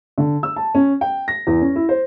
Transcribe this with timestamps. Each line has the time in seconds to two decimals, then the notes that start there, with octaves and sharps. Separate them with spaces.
0.18 D3
0.43 E6
0.56 A5
0.75 C#4
1.01 G5
1.28 A#6
1.47 E2
1.61 C#4
1.76 E4
1.89 C5